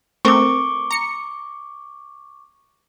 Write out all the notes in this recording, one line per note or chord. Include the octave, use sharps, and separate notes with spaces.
A3 C4 A#4 C#6 D6
A#5 C#7